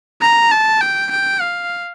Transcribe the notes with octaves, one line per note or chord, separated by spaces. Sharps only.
A#5
A5
G5
G5
F5